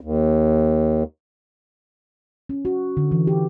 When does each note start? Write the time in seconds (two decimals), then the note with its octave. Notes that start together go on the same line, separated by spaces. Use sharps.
0.01 D#2
2.49 C#4
2.65 F#4
2.97 D3
3.12 E3
3.27 G4